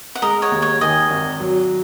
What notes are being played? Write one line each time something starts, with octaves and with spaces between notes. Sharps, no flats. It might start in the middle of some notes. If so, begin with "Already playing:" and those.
F#5
G#3 A#4 D#5
C#5 F#5
D#2
C#5 F#5
D#3 D#5 G#5
G#1
F#3